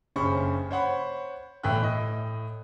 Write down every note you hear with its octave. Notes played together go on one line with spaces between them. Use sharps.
F#1 G2 C#4 C5 B5 C#6
C5 C#5 F#5 B5
G1 A2 E3 E4 G5 F#6
A2 D#5